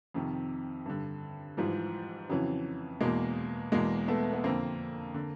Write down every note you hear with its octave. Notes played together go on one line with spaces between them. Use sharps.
F2 C3 D#3
G2 D3
G#2 E3 F3 G3
F2 C#3 E3 F#3
E2 B2 G#3 A#3
E2 B2 G#3 A#3
A3 B3
B3
F2 D3 A#3 C4
D3